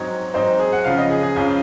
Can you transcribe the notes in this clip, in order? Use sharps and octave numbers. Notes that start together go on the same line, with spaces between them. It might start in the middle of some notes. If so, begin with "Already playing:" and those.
Already playing: G#2 F#3 C4 D#4 C#5
G#2 F#3 C4 D#4 C5
G#4
F#5
C#2 C#3 F3 F5
D#5
G#4
G#4
C#2 C#3 F3